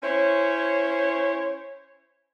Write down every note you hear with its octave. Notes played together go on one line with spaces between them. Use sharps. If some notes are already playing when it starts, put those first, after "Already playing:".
C#4 E4 C5 C#5